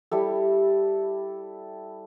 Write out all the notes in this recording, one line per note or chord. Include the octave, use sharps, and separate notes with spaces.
G3 E4 A4